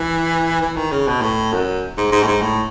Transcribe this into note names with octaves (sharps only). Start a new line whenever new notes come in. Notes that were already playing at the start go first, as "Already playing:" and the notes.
Already playing: E3
E3
D#3
C#3
B2
A2
F#2
G#2
G#2
A2
G#2
A2